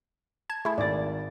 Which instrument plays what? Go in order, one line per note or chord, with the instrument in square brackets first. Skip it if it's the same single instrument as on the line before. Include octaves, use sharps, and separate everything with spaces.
[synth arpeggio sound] A5 G#6
[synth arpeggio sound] A3 E4 [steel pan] G#4
[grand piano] G#1 A6 [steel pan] D5